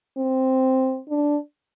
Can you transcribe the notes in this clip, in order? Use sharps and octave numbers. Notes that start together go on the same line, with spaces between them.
C4
D4